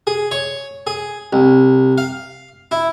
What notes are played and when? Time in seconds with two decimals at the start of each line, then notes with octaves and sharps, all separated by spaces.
0.07 G#4
0.31 C#5
0.87 G#4
1.33 C2
1.98 F5
2.71 E4